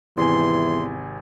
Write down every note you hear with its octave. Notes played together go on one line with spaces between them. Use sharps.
G#1 E2 C3 E3 G#5 C6